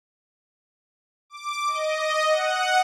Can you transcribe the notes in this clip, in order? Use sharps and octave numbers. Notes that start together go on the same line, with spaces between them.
D6
D#5
F#5